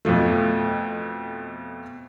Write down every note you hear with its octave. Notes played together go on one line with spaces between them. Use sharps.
F2 B2 F3 A3